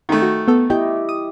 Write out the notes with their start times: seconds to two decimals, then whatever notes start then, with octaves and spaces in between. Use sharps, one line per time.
0.09 D#3 A3
0.22 F#4
0.48 B3 A4
0.70 E4 G4 D#5 G5
1.09 D#6